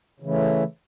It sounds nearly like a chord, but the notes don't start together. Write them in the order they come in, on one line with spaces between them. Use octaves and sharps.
C#3 E3 A3